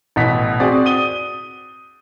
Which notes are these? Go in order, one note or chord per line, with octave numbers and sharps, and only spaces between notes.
A1 B2 B6
C4 F#4 G#4 D5 G#5
D#6 D#7 G7